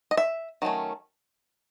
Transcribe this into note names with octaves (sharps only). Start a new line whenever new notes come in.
D#5
E5
D#3 F#3 A3 C#4